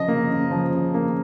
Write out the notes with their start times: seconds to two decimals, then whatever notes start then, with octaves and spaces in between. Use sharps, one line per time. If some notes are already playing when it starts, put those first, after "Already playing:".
Already playing: C#3 F3 D#5
0.08 A#3
0.30 C#3
0.51 F3
0.73 C#3
0.94 A#3